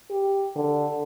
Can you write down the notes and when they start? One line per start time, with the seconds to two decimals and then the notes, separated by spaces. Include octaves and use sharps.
0.10 G4
0.56 D3